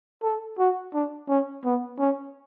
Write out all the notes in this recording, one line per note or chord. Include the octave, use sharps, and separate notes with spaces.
A4
F#4
D4
C#4
B3
C#4